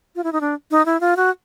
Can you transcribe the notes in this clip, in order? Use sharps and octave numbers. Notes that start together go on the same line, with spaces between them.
F4
E4
D#4
D4
D#4
E4
F4
F#4